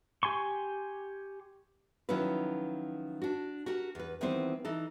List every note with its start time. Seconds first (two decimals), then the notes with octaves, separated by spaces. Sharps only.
0.23 G4 G#5 C6 C#6
2.09 D#3 F3 F#3 C#4 E4 B4
3.22 D4 F#4
3.66 F#4 G4 A#4
3.95 E2 B4
4.21 D#3 E3 G3 B3 C4 C5
4.65 E3 D#4 A4